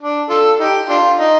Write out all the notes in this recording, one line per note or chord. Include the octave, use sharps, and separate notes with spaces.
D4
F4 A4
D#4 G4
D4 F4
D#4